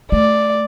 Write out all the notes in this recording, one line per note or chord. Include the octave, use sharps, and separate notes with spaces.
A3 D5